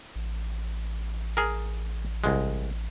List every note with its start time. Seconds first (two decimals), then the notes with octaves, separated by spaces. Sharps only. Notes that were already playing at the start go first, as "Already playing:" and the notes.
0.16 A1
1.37 G#4 A#4
2.24 C2 G#3